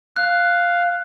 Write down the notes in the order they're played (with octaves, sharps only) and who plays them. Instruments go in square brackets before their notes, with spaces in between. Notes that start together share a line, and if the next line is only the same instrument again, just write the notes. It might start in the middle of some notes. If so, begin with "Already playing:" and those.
[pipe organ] F5 [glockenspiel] F#6